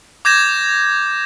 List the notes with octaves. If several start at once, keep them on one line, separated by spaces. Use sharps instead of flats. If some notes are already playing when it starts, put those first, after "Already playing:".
D6 G6 G#6 A#6 E7